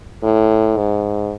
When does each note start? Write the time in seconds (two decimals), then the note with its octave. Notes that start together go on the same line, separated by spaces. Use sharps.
0.23 A2
0.77 G#2